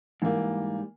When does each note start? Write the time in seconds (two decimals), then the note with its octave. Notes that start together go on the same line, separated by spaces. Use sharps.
0.22 G#2 E3 G3 A#3